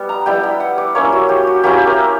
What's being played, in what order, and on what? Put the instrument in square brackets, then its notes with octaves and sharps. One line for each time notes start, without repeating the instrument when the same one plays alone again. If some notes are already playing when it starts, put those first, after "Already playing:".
Already playing: [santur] G3 B3
A#5
G3 B3 E4 G5
B5
F#5
D5
A#3 C#4 E4 C#5
F#4
G4
F#4
A#3 C#4 E4 G4
A#4